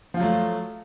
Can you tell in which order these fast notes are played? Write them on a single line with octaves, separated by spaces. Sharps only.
F3 F4 F#3 A3